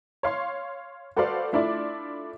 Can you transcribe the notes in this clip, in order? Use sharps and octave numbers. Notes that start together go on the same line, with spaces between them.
C#5 F5 C6
F#4 A4 B4 C5 D5 F5
A3 D4 E4 F4 D5